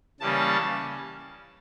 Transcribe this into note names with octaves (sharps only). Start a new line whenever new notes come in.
C#3 E3 G3 A#3 C#4 A5